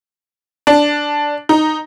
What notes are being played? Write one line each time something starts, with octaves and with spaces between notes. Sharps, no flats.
D4
D#4